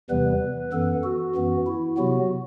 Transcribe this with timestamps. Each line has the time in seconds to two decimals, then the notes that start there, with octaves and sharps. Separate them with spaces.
0.10 E2 C3 E3 G3 B3 B4
0.72 F#2 E3 B3 A4
1.04 F#4
1.36 F#2 E3 B3
1.67 E4
1.97 C3 F#3 B3 F#4